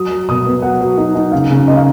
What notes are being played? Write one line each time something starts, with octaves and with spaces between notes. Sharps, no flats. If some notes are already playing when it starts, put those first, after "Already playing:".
Already playing: F#3 D#6
F#3
B2 D#6
B3
F#3 F#5
F#3
D#4
D#4
C#3 F5
C#3
C#3 D#5
F5